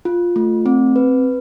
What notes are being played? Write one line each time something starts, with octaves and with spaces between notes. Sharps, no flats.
F4
A3
C4
B4